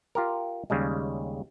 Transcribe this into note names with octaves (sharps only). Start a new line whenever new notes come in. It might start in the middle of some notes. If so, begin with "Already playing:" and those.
F4 G4 A#4
D#2 C#3 G3 G#3